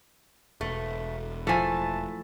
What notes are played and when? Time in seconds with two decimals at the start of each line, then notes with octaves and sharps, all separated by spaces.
0.61 E1 A3
1.47 E3 F3 A3 G#5 A5